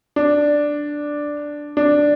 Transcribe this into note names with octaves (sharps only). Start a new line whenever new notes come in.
D4
D4